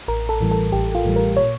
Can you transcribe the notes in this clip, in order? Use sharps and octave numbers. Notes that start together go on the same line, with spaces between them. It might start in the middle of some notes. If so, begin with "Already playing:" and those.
A1 A#4
A4
A2 E3 G3
A4
A1 G4
F4
A2 E3 G3
A#4
A#2 C#5